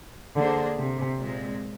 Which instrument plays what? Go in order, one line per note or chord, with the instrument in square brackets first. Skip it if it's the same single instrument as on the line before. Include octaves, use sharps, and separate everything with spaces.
[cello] D3 [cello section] A#3 D4 G#4 C5
[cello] C3
[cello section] A#2 G#3 C4